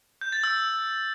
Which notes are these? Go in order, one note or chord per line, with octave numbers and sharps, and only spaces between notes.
G6
A6
E6